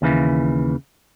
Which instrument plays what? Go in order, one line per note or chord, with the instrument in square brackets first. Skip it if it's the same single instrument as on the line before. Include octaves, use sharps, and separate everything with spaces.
[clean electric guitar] D#2 C#3 E3